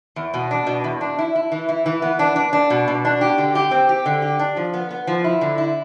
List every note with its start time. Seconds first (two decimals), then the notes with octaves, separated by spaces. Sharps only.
0.16 E2
0.34 B2
0.51 D4
0.67 B2
0.84 E2
1.01 D4
1.18 E4
1.35 E4
1.52 E3
1.69 E4
1.86 E3
2.02 B3
2.19 D4
2.36 D4
2.53 D4
2.70 B2
2.88 B2
3.05 D4
3.21 G4
3.38 D3
3.55 G4
3.71 C4
3.89 G4
4.06 D3
4.22 G4
4.39 D4
4.57 F3
4.73 B3
4.90 B3
5.07 F3
5.24 E4
5.41 D3
5.58 E4